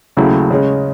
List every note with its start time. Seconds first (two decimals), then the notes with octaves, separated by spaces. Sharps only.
0.17 D#2 C#3 F#3 A3 E4
0.50 C#3 G#3 C#4